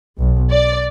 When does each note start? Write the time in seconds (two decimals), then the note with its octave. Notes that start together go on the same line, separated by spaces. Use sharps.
0.18 B1
0.52 D5